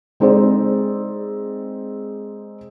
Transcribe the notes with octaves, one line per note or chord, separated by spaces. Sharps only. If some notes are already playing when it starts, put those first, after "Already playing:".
G#3 C4 D#4 G#4 C5 D5